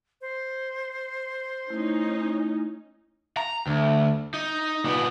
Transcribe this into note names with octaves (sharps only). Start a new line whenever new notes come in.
C5
A3 C#4 D#4 E4
A#5
D2
D#4
A#2 B3